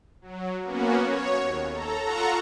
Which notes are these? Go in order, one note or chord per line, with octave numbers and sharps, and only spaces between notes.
F#3
A#3 B3 C#4 F#4
C#5
D#2
A4 A#5
F4 A4 F#5 A#5 C#6